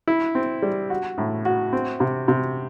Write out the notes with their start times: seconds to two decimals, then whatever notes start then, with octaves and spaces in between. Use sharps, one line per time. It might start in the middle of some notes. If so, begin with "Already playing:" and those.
0.08 E4
0.35 C4
0.62 G3
0.90 F#4
1.18 A2
1.45 F#4
1.73 C4
2.00 C3
2.28 C3